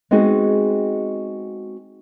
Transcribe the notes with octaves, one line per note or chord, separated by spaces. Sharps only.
G#3 B3 C4 D#4 F#4 G#4